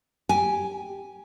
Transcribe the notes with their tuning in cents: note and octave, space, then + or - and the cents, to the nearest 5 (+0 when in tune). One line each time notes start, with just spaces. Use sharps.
G4 +0 G#5 +0